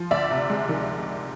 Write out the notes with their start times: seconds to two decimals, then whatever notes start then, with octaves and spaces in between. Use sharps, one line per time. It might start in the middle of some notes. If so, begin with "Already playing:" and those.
Already playing: F3
0.11 D2 D5 E5
0.31 C3
0.50 G#3
0.69 D#3